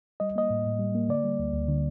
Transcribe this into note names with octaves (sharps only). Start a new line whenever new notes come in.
G3 D#5
A#3 D#5
A2
A2
G3
A#3
D3 D5
G3
D2
D2
D3